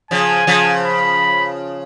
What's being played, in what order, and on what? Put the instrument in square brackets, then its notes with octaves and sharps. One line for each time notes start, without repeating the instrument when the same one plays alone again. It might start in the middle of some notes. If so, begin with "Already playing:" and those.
[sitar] C#3 F3 [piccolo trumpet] G#5
[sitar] C#3 F3
[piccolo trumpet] B5